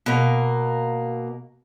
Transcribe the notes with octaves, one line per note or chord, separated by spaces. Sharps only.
B2 A#3